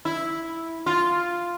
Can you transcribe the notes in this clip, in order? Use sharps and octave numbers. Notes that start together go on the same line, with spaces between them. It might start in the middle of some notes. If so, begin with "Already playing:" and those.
E4
F4